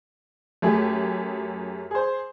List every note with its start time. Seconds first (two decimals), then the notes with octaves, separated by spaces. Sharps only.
0.62 F#2 A3 G4 G#4
1.91 G#4 C5